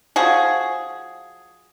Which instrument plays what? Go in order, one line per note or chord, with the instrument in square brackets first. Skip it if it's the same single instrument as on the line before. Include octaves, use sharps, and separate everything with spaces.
[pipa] F3 F#4 G#4